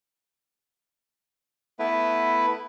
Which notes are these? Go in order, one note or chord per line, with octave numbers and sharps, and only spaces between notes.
A3 B3 E4 B4